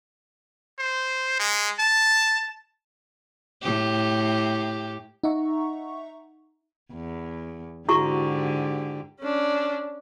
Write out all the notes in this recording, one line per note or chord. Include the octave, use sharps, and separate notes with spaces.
C5
G#3
A5
A2 G4
D#4 E5 F#5 A#5 C#6
E2
G#2 D3 E4 F#4 G4 C#6
C#4 D4